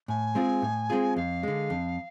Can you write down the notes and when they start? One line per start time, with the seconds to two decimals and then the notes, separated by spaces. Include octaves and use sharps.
0.08 A2 G#5
0.35 G#3 C4 F4 G#4
0.62 A2
0.90 G#3 C4 F4 G#4
1.16 F2 F5
1.43 D3 G#3
1.70 F2